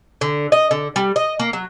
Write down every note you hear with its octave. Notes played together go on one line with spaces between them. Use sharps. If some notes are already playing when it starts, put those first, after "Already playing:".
D3
D#5
D3
G3
D#5
A#3
F#3